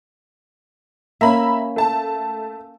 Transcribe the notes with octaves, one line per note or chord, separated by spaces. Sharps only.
A#3 C#4 E5 A#5 B5
A3 A5